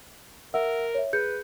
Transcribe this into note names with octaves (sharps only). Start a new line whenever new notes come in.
A#4 E5 F#5 E6
C#5 E5
G#4 B4 G6 C#7